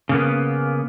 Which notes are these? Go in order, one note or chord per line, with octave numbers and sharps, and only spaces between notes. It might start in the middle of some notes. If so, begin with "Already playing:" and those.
C#3 A#3 B3